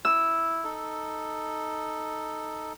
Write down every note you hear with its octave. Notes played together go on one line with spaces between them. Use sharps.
E4 E6
D#4 A4